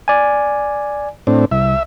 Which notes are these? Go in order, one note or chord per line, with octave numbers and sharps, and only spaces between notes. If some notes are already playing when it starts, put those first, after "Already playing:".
D5 G#5
A2 C4 D4
C2 E5